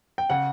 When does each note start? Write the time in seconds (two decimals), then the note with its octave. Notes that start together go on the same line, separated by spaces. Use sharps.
0.18 G5
0.30 C#3 F#5